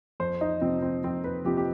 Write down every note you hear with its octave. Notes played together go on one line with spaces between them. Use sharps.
F2 C5
D#4
C3 F3 C4
C4
F2 C4
B4
C3 F3 G4
G4